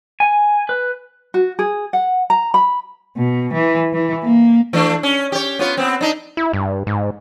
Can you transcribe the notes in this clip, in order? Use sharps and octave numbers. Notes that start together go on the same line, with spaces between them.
G#5
B4
F#4
G#4
F#5
A#5
B5
B2
E3
E3
A#3
E3 A3 D4
C#4
G4 C#5
B3 F4 C#5
B3 C4
D4 D#4
E4
G2
G#2